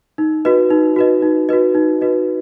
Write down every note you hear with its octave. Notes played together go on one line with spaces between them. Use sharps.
D#4
F#4 B4 D#5
D#4
F#4 B4 D#5
D#4
F#4 B4 D#5
D#4
F#4 B4 D#5